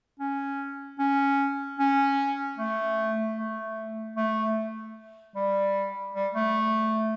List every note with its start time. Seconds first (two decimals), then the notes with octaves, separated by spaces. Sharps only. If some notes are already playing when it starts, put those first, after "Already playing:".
0.20 C#4
0.99 C#4
1.79 C#4
2.58 A3
3.36 A3
4.16 A3
5.35 G3
6.14 G3
6.34 A3